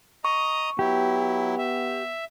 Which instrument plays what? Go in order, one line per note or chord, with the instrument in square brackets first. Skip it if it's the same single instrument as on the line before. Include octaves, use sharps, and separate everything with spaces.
[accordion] D#5 A#5 D#6 [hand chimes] C#6
[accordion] F#3 E4 [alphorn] B3 [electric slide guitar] G4
[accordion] E5